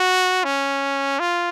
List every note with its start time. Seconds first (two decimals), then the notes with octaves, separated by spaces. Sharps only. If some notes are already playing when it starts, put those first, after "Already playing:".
Already playing: F#4
0.44 C#4
1.20 F4